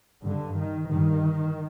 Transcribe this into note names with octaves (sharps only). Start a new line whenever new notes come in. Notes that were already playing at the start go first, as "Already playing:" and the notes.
G2 D3
D#3
G2 D#3